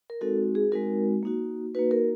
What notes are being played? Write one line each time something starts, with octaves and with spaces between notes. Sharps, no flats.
A#4
G#3 C4 D#4 F#4 A4
G#4
G#3 C4 D#4 F#4 A#4
A#3 D#4 F#4
A#3 D#4 F#4 B4
A#4